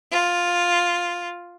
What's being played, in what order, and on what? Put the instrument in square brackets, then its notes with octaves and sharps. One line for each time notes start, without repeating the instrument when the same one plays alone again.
[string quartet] F4